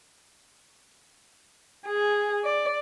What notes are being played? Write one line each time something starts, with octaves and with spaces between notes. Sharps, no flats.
G#4
D5